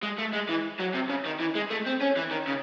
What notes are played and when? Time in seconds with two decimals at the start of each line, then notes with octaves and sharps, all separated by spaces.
0.03 G#3
0.18 A3
0.33 G#3
0.49 E3
0.79 F#3
0.94 C3
1.09 C#3
1.25 D#3
1.40 E3
1.55 G#3
1.70 A3
1.86 C4
2.01 C#4
2.17 E3
2.31 D#3
2.47 C#3